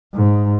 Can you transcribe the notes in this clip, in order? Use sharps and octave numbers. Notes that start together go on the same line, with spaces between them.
G#2